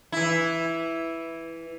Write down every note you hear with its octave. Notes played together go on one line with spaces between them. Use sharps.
E3 E4